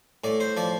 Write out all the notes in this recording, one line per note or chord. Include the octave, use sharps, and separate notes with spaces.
A2 D5
C5
F3 D5